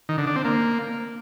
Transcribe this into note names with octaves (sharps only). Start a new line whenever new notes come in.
D#3
D3
D4
C4
A#3